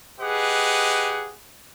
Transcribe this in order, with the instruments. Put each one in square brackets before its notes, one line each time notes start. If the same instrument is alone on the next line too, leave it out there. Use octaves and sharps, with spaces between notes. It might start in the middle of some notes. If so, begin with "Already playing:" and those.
[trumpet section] G4 G#4 B4 D#5 F#5